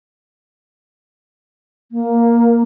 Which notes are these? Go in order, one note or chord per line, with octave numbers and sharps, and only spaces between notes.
A#3